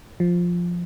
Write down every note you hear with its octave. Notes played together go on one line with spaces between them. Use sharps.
F3